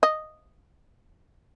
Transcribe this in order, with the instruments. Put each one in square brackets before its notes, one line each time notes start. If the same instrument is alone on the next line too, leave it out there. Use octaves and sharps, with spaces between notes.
[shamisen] D#5